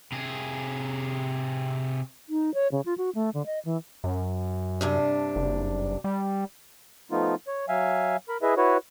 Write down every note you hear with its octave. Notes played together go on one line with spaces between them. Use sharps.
C3 G#4
D#4
C#5
C#3
F4
F#4
A3
D3
D#5
E3
F#2
G2 C3 D4
F#1
G3
F3 A3 B3 D#4 F4
C#5
F#3 E5 F5 G#5
A#4 B5
E4 G#4 B4 D#5 E5
E4 F#4 B4 C#5